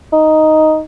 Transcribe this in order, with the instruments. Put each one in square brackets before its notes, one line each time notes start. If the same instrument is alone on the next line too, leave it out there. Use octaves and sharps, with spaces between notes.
[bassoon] D#4